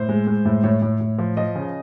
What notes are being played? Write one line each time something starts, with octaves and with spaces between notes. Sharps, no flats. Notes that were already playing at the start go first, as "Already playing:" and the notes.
Already playing: A2 C5
G#3
G#3
A2
A2 C#5
A2
A2
F3
F3 D#5
C#3